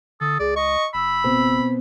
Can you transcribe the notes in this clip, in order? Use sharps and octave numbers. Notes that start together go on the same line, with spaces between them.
D3 A4 D#6
C#2 G#4 D5
D#5 C#6
F#1 B5 E6
B2 C4